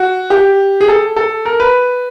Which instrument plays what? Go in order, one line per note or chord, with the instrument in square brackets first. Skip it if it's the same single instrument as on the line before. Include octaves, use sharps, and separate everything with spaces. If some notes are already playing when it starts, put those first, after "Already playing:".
Already playing: [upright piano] F#4
G4
G#4
A4
A4
A#4
B4